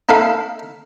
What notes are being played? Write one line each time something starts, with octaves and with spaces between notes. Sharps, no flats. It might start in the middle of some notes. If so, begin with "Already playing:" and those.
D#4 E4 A4 F5 B5